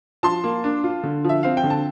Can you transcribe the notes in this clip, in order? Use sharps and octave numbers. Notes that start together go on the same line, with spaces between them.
F3 A5 C6
A#3
D4
F4
D3
F3 E5
C4 F5
G5
D3
A5